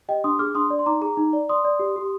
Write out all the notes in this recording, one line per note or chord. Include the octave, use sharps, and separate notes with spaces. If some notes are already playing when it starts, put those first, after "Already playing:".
G4 D#5 G5
D4 C6 D#6
G#4 D6 F6
D4 C6 D#6
D5
C6
D#4 A#5 D6
G#4 A#5 D6
D#4
D5
D5 C6 D#6
D5
G4
G4